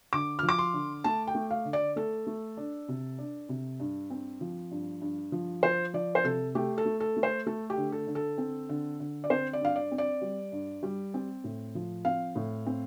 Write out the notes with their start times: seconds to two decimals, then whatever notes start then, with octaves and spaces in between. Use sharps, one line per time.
0.13 D3 D6
0.39 F3 F6
0.49 D6
0.59 C6
0.74 D3
1.04 A3 A5
1.27 G5
1.35 A3
1.51 F5
1.65 D3
1.73 D5
1.96 A3 A4
2.27 A3
2.57 D4
2.88 C3
3.18 D4
3.49 C3
3.80 G2
4.10 C4
4.41 F3
4.71 G2
5.02 G2
5.32 F3
5.63 F3 C5
5.94 F3 D5
6.15 C5
6.24 C3 A4
6.55 A3 G4
6.78 A4
6.86 A3
7.00 A4
7.17 A3
7.23 C5
7.47 A3 A4
7.70 G4
7.77 D3
7.92 A4
8.07 D3
8.15 A4
8.38 C4
8.69 D3
9.00 D3
9.24 D5
9.30 C4 C5
9.53 D5
9.61 G2 F5
9.76 D5
9.91 C4
9.98 D5
10.22 G3
10.52 G2
10.83 G3
11.14 C4
11.44 A2
11.75 F3
12.05 C4 F5
12.35 A2
12.66 C4